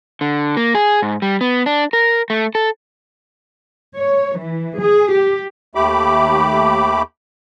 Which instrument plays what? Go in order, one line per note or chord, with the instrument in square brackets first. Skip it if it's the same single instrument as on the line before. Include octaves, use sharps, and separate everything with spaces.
[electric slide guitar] D3
A#3
G#4
G#2
G3
B3
D4
A#4
A3
A4
[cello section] C#5
E3
G#4
G4
[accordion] D#2 A3 G4 B5 D6